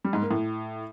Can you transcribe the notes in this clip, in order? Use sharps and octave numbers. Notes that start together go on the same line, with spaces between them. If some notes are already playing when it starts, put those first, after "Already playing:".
G3
G#2
A#3
A2